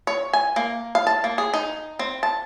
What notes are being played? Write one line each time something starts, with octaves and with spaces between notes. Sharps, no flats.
C#5
G#5
A#3
F5
A5
A#3
G#4
D#4
C4
A5